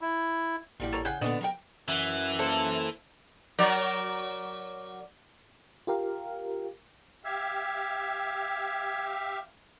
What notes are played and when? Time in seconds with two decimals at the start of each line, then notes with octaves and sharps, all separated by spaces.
0.01 E4
0.80 A1 A#2 F#3 G3 E4
0.92 A4 A#4 C#5
1.05 C#3 G#4 F#5 G5
1.21 A#2 D3 B3 D4 F#4 D#5
1.41 F#3 A#4 C5 G5
1.88 F#2 E3 E5
2.39 A#3 A4 C5
3.58 F#3 A#4 D5
5.87 F4 G4 A#4 F5
7.24 G4 E5 F5 G#6